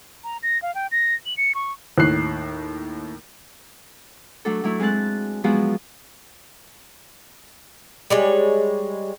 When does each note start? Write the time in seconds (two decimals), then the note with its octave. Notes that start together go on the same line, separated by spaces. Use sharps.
0.24 A#5
0.43 A#6
0.62 F5
0.75 G5
0.92 A#6
1.26 F#7
1.37 C#7
1.55 C#6
1.98 D#2 A2 F#6 C7
4.45 F#3 A3 D4 F#4 A4
4.64 F#3 A3 E4
4.80 G#3 C4 F#4 A5 F#6
5.44 F3 F#3 G#3 B3 F4 F#4
8.10 G3 G#3 C#5